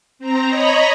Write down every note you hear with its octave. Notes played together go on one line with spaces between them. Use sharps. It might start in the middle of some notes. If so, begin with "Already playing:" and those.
C4 A#5
C#5 D#5 A#5 B5